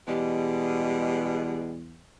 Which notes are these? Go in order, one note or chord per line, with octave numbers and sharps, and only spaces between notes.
E2 B2 G3 G#3 G4